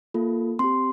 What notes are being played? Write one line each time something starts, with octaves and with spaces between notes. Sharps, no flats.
A#3 F4 A4
C4 G4 C6